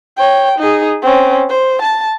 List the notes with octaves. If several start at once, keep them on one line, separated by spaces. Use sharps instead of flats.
C#5 G5
D#4 G#4
C4 C#4
C5
A5